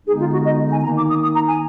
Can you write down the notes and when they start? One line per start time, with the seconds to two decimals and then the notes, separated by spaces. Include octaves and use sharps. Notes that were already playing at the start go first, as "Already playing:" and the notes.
0.06 D3 G#3 B3 D#4 G#4
0.20 F4
0.32 F#4
0.45 D#5
0.71 G#5
0.83 D#3 A#3 D#4 A#5
0.96 D6
1.09 D#6
1.22 D#6
1.35 A#5
1.48 G#5